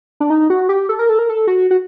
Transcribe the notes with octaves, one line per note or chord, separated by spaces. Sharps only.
D4
D#4
F#4
G4
A4
A#4
A4
A#4
A4
F#4
F#4